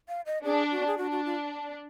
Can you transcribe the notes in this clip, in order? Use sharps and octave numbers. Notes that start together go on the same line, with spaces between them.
F5
D#5
D4 G#4
F#4
G#4
D4 F#4
F#4
F4